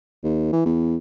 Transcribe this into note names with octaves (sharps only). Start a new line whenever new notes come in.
D#2
E3
E2